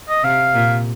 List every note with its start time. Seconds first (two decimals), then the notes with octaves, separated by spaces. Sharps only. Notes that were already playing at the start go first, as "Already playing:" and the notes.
0.09 D#5
0.24 C3 F5
0.54 A#2